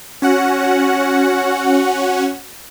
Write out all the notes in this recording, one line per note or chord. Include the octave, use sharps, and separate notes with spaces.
C#4 F#4 F#5